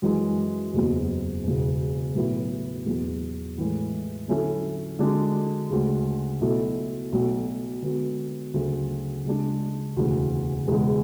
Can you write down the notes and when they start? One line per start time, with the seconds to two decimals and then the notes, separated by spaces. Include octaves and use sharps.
0.02 F#2 E3 G#3
0.73 F#1 E2 B2 F#3
1.44 E1 E2 C#3
2.15 B1 A2 F#3 B3 E4
2.86 E2 B2 F#3
3.57 A2 E3 G#3
4.28 D3 F#3 C#4 E4 A4
4.99 D3 G#3 D4 F#4
5.70 D2 C#3 G#3
6.41 B1 B2 A3 E4 A4
7.12 B1 B2 A3
7.82 D3 G#3 B3 F#4
8.54 D2 C#3 F#3 A3
9.25 C#3 G#3 D4
9.96 E1 D2 C#3 E3
10.66 E1 E2 C#3 G#3